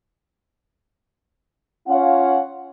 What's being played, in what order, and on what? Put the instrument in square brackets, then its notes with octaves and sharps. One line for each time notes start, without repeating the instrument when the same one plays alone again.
[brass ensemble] C#4 F4 C#5 F5 F#5